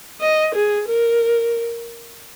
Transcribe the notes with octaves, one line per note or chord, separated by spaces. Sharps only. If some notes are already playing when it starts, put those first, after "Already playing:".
D#5
G#4
A#4